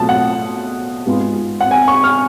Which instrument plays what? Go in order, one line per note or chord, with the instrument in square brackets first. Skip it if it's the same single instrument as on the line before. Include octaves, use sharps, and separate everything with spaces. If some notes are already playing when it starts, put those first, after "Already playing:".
Already playing: [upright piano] B2 F#3 A3 F4 A5
F#5
G#2 G#3 B3 F4
F#5
G#5
C#6
F6